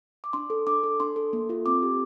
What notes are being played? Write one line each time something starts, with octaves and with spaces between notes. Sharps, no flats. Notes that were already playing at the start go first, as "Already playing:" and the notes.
D6
D4 C6
A4
D4 D6
A4
D4 C6
A4
A#3
F4 A4
C4 D6
G4